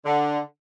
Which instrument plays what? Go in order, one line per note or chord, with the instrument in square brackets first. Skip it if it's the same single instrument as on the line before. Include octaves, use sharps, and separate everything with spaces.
[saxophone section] D3